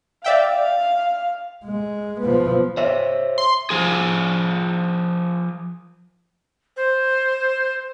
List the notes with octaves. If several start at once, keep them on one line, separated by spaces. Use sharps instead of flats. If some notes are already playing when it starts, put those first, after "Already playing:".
D5 E5 F5 G5
G#3
F3 B3
C5 C#5 E5
C6
F3 G#4
C5